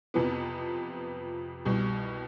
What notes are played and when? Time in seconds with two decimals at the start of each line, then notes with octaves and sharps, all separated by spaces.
0.14 F2 C3 F3 B3
1.65 C2 B2 G3